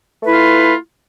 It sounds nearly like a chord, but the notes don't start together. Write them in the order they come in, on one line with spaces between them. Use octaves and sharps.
A3 B4 E4 F4